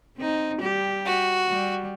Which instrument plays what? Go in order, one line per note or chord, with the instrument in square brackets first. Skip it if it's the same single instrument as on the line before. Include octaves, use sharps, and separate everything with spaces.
[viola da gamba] C4 D#4
G3 G4
[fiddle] F#4
[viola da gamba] G3